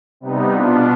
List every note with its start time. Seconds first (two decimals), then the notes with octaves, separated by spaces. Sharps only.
0.20 C3 G3 B3 D#4
0.53 B2 B3 D4 F4